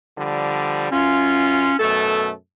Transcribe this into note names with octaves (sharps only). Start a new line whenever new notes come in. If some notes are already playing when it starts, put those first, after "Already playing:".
D3 F3 G3
F#2 C#4 F4
F#2 B2 A3 A4